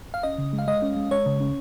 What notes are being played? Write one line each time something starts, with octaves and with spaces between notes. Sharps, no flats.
F5
C#4 D#5
C#3
G#3
F5
G#3 D#5
C#4
G#3
G#3 C#5
C#3
C#4